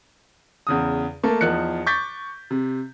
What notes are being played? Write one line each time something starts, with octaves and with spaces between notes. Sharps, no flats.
E2 C#3 D#6
A3 A#3 A4
E2 F3 D#4 F#6 C#7
C#6 D6 G6 A6 B6
C3